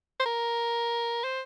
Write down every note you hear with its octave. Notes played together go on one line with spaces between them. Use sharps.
C5
A#4
C5